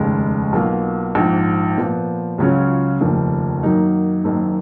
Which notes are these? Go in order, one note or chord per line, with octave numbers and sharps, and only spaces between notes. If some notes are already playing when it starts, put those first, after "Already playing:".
Already playing: F1 D#2 C#3 G#3
B1 B2 A#3 F4
A#1 G#2 F3
A#2 F3 B3
C#2 C#3 F#3 C#4 F4
F1 D#2 C#3 F3 A#3
F#2 D#3 F#3 A#3 D#4
F#1 F#2 D#3 A#3